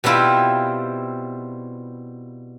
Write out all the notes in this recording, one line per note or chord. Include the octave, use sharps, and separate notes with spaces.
B2 G3 C4 E4 F4